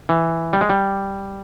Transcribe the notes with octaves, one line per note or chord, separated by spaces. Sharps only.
E3
G3
G#3
G3